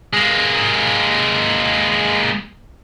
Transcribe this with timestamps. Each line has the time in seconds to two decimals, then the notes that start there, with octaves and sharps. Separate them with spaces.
0.13 G#3 A#3